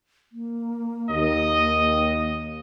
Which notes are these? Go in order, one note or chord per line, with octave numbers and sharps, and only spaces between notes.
A#3
D#2 D#5